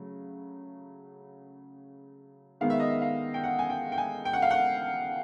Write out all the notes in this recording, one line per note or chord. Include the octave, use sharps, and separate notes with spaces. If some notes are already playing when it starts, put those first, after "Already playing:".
Already playing: C#3 F#3 A3
D#3 G#3 B3 F5
E5
D#5
E5
F5
G5
F#5
G#5
G5
G5
G#5
G5
F#5
F5
F#5